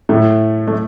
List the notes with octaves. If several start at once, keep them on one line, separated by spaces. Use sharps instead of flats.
A2 A3
A3